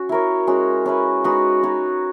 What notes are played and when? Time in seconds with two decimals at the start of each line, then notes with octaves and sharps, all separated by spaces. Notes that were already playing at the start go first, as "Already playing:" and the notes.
Already playing: C#4 F#4
0.09 E4 A#4 C#5
0.47 G#3 C#4 F#4
0.86 C#4 E4 B4
1.24 G#3 D#4 F#4 B4
1.63 D#4 F#4 C#5